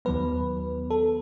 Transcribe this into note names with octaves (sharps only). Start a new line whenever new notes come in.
D#2 D#3 F#3 B3 B4
A4